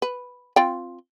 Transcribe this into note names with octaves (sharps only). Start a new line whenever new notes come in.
B4
C4 F4 G5